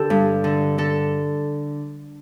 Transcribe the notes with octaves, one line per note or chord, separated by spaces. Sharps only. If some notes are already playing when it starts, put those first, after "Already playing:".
Already playing: D3 G4 A4
G2
D3
D3 A4